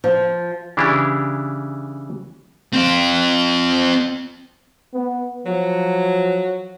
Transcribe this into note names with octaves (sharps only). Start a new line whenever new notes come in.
F3
C#3 E3 D4 E4 G4
C4 F4
B3
F3 F#3